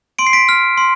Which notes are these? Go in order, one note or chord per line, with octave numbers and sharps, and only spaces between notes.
C6 D7
C7
B6 D7
F6
C6